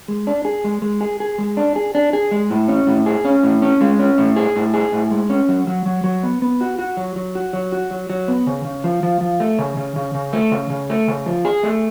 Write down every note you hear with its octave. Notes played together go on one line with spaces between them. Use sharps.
G#3
D4
G#4
G#3
G#3
G#4
G#4
G#3
D4
G#4
D4
G#4
G#3
A2
C#4
A2
G#4
C#4
A2
C#4
G#3
C#4
A2
G#4
A2
G#4
A2
G#3
C#4
F#3
F#3
F#3
F#3
B3
B3
F#4
F#4
F#3
F#3
F#4
F#3
F#4
F#3
F#3
B3
C#3
C#3
F3
F3
F3
A3
C#3
C#3
C#3
C#3
A3
C#3
C#3
A3
C#3
F3
G#4
A3